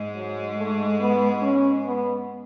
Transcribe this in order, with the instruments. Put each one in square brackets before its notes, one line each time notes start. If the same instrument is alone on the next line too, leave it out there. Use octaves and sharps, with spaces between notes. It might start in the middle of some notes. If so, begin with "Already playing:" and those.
Already playing: [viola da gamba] G#2 G#3
[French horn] F#3
A3
B3
C#4
B3